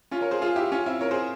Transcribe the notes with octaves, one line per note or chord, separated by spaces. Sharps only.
C#4 F4
A#4 C#5
G#4 C5
F4 G#4
E4 G4
C#4 F4
C4 E4
A#4 C#5
G#4 C5